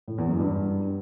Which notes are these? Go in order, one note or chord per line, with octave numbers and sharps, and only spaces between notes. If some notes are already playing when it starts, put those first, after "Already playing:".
A2
E2
F#2
G2